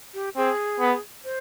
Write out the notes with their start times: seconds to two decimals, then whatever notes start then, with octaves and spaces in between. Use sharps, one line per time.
0.14 G4
0.37 C4 G#4
0.80 B3
1.25 C5